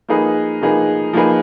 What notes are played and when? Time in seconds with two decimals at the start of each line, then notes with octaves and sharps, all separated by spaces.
0.09 F3 A#3 D#4 G#4 B4
0.62 F3 A#3 D#4 G#4 B4
1.13 F3 A#3 D#4 G#4 B4